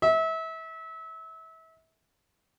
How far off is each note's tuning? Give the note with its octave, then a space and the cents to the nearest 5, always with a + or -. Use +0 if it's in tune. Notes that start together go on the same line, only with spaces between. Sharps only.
E5 -30